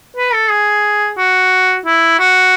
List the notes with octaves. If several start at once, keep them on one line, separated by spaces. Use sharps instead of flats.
B4
A4
G#4
F#4
E4
F#4